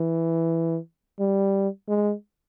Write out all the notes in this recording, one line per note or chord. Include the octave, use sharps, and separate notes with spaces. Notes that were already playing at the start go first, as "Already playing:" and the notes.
Already playing: E3
G3
G#3